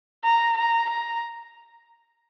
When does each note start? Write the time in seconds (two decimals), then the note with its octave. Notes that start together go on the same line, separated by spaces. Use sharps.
0.24 A#5
0.58 A#5
0.90 A#5